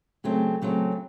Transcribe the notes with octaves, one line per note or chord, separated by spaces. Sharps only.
C#3 F#3 A3 C4
C#3 F#3 A3 C4